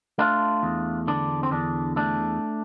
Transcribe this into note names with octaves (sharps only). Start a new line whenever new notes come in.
A3 D4 F4
E2
D3 D4
C4
E2 D4
A3 D4